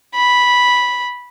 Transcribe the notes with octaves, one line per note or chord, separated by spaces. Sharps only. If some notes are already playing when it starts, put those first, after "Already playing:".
B5